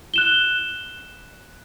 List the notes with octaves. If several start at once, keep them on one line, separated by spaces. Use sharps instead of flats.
F#6 E7 G7